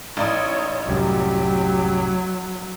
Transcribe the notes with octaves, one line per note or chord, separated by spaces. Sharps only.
A1 D#4 C#5 D5 D#6
C2 F#2 A2 F#3 G4